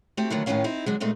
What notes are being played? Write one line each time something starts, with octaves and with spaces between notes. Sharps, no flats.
A3 C4 F#4 G4
D3 D#3 F#3 A3 B3
A2 D#3 F#3 B3 C#4 F5
C4 D#4 E4
D3 F#3 G#3
A#2 G#3 A3 C4 D#4